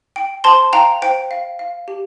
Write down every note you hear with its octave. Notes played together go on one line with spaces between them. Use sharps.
G5
C5 A5 C6
F5 G5 A#5
C5 G5
F5
F5
G4